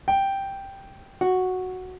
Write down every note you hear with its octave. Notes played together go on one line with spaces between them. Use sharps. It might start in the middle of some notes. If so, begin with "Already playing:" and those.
G5
F#4